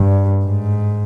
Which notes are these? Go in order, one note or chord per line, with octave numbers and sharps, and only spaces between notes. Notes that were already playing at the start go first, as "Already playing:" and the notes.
Already playing: G2
G#2